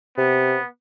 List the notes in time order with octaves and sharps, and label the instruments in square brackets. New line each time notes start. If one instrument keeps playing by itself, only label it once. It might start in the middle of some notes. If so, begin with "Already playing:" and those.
[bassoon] C3 [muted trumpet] B3